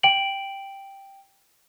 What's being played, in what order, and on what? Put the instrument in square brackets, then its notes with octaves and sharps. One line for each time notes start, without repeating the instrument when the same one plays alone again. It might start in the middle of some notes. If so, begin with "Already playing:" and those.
[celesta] G5 D7 F#7